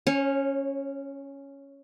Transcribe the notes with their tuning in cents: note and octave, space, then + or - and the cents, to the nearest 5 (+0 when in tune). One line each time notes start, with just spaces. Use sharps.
C#4 +0 C#5 -30